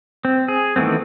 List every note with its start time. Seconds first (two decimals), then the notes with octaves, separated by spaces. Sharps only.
0.25 C4
0.48 G#4
0.76 D#3 E3 A3 B3 C4